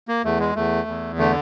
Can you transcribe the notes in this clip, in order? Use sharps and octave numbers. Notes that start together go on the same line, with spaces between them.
A#3
E2 A3
G#3
E2 A3
E2
D3 A3